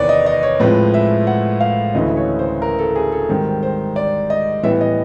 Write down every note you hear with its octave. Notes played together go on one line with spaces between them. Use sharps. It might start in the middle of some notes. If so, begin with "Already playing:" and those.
Already playing: E2 C3 D#3 B4 C#5 D5
D#5
D#5
C#5
A2 F3 G#3 C4 B4
E5
F#5
F5
D2 C#3 E3 A3 D#5
C#5
C5
A#4
A4
G#4
A4
G#2 D#3 G3 C4
C5
D5
D#5
A2 E3 G3 B3 E5
D#5